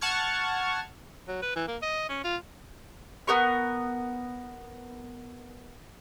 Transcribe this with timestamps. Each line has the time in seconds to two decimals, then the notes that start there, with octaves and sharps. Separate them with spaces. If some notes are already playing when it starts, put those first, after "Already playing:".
0.01 F#5 A5 C#6 F6 G#6
1.28 F#3
1.42 B4
1.56 E3
1.68 A#3
1.82 D#5
2.09 C#4
2.24 F4
3.27 B3 A#4 C#6